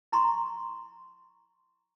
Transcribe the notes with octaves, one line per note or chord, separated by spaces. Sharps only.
E4 A#5 C6 C#6